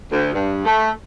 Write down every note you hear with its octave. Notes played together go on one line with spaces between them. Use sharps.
D2
G2
A3